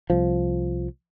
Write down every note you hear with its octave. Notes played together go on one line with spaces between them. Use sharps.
C2 F3